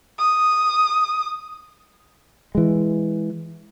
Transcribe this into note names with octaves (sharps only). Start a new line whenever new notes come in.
D#6
E3 G#3